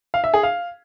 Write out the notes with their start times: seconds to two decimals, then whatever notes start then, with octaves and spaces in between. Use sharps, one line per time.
0.14 F5
0.24 E5
0.34 G#4
0.43 F5